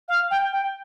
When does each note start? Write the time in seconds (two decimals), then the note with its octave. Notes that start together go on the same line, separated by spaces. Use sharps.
0.08 F5
0.31 G5
0.53 G5